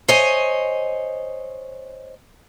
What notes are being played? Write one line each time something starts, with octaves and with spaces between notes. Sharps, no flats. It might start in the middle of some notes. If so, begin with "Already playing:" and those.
C5 C#5 D#5 G#5